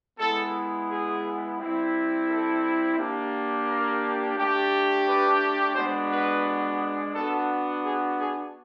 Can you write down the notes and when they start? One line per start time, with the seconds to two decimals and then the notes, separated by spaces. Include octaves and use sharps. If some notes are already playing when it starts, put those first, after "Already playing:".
0.19 G#3 B3 E4 A4
0.89 G#4
1.59 G3 C4 E4
2.28 A4
2.98 A#3 D4 G4
3.67 A#4
4.36 A3 D4 G4
5.06 B4
5.75 G#3 B3 D4 F#4 C5
6.11 B4
7.14 B3 D4 F#4 A4
7.83 G#4
8.19 G#4